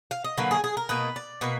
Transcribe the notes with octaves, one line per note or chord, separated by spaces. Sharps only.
F5
D#5
D3 F#3 A#3 B4
G#4
G#4
A#4
B2 A#3 D#4 B4
D5
B2 A#3 B4